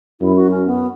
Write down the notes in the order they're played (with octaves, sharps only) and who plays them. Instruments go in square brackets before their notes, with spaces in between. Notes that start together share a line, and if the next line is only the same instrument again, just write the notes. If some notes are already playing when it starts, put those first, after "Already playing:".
[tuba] F#2 [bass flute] E4
[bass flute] F#4
C#4
B3